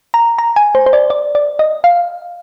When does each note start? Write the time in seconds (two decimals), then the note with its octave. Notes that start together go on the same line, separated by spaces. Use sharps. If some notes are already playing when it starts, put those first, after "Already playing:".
0.14 A#5
0.38 A#5
0.56 G#5
0.75 C5
0.86 C5
0.93 D5
1.10 D5
1.35 D5
1.59 D#5
1.84 F5